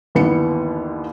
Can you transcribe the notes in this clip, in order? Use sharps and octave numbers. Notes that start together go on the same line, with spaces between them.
G1 D#2 E3 B3 C#7